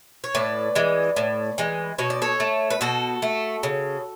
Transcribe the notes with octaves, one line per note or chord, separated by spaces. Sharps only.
C#5
A2 B4 D5
E3 G#3
A2
E3 G#3
B2 C#5
D5
A4 C#5
A3
B4
B2 F#4 A4
A3
C#3